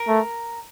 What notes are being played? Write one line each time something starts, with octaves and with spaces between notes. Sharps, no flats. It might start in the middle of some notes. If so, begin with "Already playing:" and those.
Already playing: A#4
A3